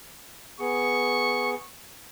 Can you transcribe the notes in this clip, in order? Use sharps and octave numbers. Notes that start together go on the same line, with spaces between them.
B3 G#4 C#6